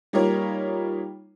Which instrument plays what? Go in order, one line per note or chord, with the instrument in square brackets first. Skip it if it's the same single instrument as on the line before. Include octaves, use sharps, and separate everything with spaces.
[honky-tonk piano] G3 A#3 D#4 F4 A#4 C#5